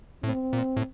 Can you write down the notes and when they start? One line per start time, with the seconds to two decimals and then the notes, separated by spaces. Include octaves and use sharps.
0.23 A2 C4
0.53 A#2
0.77 A2